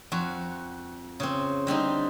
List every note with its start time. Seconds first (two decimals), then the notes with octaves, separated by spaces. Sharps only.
0.12 F2 F#4
1.20 C#3 C4
1.67 D3 G3 C4 D#4